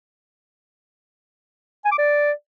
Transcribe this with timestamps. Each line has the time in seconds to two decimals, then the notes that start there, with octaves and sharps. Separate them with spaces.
1.85 G#5
1.92 D6
1.98 D5